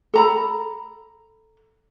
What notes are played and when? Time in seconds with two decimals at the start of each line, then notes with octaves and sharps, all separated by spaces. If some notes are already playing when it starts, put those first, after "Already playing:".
0.14 A4 A#5 B5